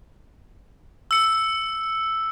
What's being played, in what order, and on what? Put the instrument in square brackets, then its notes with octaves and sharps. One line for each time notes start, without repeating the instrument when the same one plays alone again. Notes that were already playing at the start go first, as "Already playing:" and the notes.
[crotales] E6 C#7